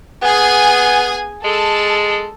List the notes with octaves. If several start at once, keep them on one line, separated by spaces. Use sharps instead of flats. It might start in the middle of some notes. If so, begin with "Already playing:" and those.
B3 G#4 G#5
G#3 A4